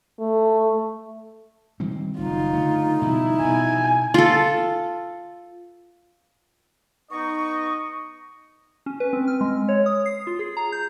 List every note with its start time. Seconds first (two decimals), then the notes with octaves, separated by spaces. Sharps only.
0.20 A3
1.80 D#3 G3 C4
2.18 F#1 D#4 F4
2.53 D3 A3
3.02 B2 F3 G3 E4
3.40 B2 G#5
4.14 F4 A4
7.12 B3 D#4 D#5 C#6
8.86 C#4
9.00 B4
9.13 C4
9.28 F6
9.41 G#3
9.69 C#5
9.86 D#6
10.06 C7
10.27 F4
10.39 G#4
10.57 A#5
10.72 G6